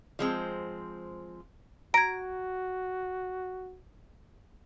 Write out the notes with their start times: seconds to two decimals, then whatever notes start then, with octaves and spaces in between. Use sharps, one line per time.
0.19 F3 G#3 C4
1.94 F#4 A#5 G#6 D7